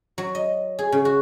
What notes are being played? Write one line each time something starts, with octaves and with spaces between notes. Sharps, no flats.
F#3
D#5
G#4
C#3
F#4